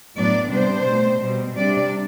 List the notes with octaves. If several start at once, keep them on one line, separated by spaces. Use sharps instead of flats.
A2 F#3 B3 D4 D5
C3 G3 B3 D4 C5
B2 A3 C4
B2 G3 C4
C3 G3 D4 D5